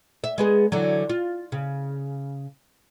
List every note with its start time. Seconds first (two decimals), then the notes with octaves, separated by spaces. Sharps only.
0.24 E5
0.38 G#3 B3 G#4
0.72 D3 E3 F#3
1.09 F4
1.52 C#3